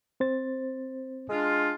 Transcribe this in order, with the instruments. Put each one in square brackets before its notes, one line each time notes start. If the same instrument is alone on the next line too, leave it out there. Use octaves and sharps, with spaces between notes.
[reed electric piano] C4 C5 A6
[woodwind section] G#3 D4 F4